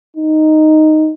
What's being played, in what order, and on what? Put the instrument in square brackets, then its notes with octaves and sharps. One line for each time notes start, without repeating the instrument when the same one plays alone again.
[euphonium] D#4